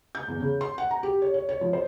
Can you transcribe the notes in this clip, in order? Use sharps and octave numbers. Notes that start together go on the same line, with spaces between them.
G6
E2
C#3
C6
F#5
A#5
G4
C#5
C#5
C#5
F3
C5